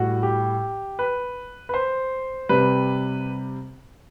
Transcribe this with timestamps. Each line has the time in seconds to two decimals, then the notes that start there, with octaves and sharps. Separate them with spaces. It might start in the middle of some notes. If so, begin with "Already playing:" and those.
Already playing: A2 G3 F#4
0.23 G4
0.99 B4
1.69 B4
1.74 C5
2.49 C3 G3 B4